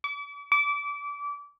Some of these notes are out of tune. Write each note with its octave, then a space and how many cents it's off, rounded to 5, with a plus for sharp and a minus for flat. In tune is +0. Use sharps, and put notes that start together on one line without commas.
D6 -40
D6 -25